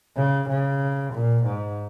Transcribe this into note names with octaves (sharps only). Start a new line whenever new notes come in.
C#3
C#3
A#2
G#2